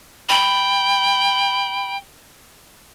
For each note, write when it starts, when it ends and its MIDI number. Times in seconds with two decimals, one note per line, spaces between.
0.29 1.97 79
0.29 1.96 83